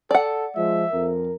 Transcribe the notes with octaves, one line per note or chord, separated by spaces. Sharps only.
A4 D5 F#5
F3 G#3 E5
F2 A#4